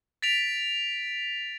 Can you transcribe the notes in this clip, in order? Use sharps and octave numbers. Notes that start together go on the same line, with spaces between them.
A6 B6 D7 F7